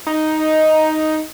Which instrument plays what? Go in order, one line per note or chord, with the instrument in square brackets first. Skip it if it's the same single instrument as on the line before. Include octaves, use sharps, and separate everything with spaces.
[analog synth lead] D#4